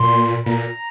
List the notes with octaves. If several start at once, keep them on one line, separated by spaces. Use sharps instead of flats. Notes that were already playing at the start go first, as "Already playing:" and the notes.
Already playing: A#2 C6
A#2 A#5